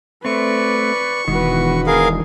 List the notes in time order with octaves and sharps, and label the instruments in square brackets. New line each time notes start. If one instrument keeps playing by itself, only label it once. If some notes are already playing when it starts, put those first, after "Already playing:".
[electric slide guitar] A3 C4 [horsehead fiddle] B4 D5 [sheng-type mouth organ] C#6
[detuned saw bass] E1 [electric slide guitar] D#3 E3 [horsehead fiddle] F#4 B4
[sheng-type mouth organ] G#4 A#4 F5